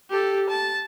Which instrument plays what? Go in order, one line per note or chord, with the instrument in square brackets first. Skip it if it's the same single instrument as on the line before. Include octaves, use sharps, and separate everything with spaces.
[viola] G4 A4
A5